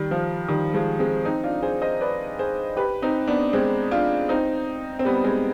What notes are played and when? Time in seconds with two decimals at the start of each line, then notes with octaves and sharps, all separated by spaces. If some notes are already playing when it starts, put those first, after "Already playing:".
Already playing: D#3 G3
0.11 F3
0.48 D#3 G3
0.74 F3 G#3
0.99 G#3 C4
1.25 C4 D#4
1.44 D4 F4
1.62 G#4 C5
1.82 C5 D#5
2.01 B4 D5
2.39 G#4 C5
2.77 G4 B4
3.02 C4 D#4
3.28 B3 D4
3.53 G#3 C4
3.91 D4 F4
4.29 C4 D#4
4.99 C4
5.05 G3 B3
5.24 G#3 C4